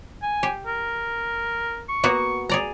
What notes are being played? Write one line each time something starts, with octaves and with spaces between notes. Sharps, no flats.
G#5
G4
A#4
C#6
A#3 B3 F#4
G#4 D5 A#5